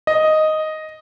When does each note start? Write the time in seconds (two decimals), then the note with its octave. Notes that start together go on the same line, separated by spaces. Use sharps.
0.07 D#5